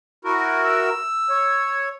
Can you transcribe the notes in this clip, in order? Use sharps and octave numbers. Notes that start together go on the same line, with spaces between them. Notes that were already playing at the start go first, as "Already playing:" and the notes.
E4 F#4 A#4
E6
C#5